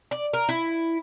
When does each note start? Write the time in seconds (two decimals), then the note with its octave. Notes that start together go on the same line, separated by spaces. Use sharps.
0.11 D5
0.33 A#4
0.49 E4